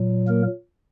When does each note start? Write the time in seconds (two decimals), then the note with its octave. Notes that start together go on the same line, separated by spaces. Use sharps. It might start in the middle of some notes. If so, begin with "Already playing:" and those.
Already playing: A#2 F#3
0.28 A#3 A#4